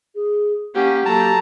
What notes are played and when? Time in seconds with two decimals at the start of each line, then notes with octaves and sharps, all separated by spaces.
0.15 G#4
0.75 A#3 C#4 G4 F#5
1.05 F#3 A#3 A4 A5 A#5